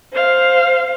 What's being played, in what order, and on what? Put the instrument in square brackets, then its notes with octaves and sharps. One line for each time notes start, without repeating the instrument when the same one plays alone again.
[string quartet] C5 F5